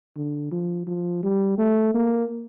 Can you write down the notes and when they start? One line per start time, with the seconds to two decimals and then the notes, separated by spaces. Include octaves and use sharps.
0.16 D3
0.51 F3
0.87 F3
1.23 G3
1.58 A3
1.94 A#3